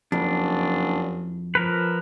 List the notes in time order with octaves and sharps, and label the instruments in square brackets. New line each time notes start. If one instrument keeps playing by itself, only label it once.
[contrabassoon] F#1 [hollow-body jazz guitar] F2 [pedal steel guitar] D4
[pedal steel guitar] F3 A#4 B4